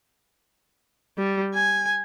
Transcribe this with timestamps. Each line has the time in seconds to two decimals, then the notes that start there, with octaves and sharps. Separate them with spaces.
1.17 G3
1.54 G#5